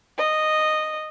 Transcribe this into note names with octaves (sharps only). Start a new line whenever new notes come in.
D#5